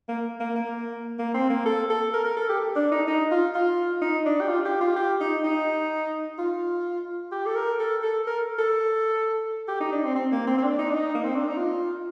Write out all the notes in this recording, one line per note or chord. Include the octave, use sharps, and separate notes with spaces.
A#3
A#3
A#3
A#3
C4
A#3
A4
A4
A#4
A#4
A4
G4
D4
D#4
D#4
F4
F4
D#4
D4
G4
F4
G4
F4
G4
D#4
D#4
F4
G4
A4
A#4
A4
A4
A#4
A4
G4
D#4
D4
C4
C4
A#3
C4
C4
D4
D#4
D4
D#4
A#3
C4
D4
D#4
F4